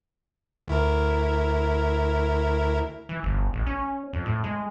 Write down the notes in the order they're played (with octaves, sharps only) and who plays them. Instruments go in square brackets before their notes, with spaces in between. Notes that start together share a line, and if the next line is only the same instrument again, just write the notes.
[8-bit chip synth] D2 E4 A#4
[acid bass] E3
G1
A1
C#4
F2
A2
G#3